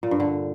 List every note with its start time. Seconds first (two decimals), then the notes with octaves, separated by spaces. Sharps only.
0.03 A#2
0.11 G2
0.20 D3